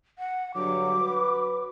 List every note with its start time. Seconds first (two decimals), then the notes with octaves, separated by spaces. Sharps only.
0.19 F#5
0.54 G2 D3 F#3 D6
1.00 F#4 B4